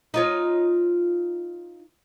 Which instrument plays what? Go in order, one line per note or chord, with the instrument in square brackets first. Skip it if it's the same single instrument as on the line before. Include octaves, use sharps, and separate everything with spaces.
[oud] D#4 F4 C#5